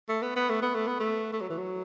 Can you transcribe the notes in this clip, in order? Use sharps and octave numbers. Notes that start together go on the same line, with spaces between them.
A3
B3
B3
A3
B3
A3
B3
A3
A3
F#3
E3
F#3